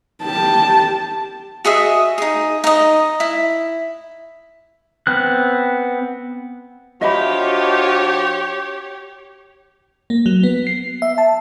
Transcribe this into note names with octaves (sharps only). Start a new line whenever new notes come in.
G4 A5
F#4 G#4 D#5 E5
D#4 G#4
D#4 D#5
E4
B3 C4 F#6
F3 D4 F#4 G4 C#5 D#5 E5 B5
A#3
F#3
B3
C7
E5
A5